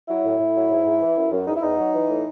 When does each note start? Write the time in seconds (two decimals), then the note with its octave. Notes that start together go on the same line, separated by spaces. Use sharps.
0.09 F#3 E4
0.24 A2
0.40 A2
0.56 F#3
0.70 G#2
0.86 G#2
1.02 E3
1.17 F#2
1.32 F#2
1.47 E2 D#4
1.56 E4
1.63 E2 D#4
1.78 F#3
1.94 E3
2.09 A2